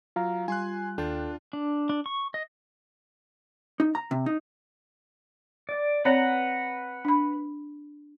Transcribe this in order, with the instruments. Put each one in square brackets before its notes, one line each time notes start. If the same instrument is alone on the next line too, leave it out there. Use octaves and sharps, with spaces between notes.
[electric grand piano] F#3 [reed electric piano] F4 F5 A#5
[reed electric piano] G3 [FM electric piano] F4 [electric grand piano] G#5 C6 F#6
[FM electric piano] D#2 G5 [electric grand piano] D4 F4 [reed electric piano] A4
[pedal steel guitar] D4
D4
C#6
D#5
[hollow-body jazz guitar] D#4
A#5
C3
D#4
[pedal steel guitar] D5
[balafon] C4 C#5 D5 [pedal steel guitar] B4 F#5 A#5
[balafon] D4 B5